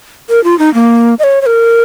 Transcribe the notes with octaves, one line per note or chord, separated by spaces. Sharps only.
A#4
F4
D#4
A#3
D#5
C#5
C#5
A#4